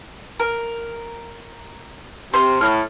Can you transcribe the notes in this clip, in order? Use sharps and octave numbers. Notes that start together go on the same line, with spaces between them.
A#4
C3 C5 F6
A2 F6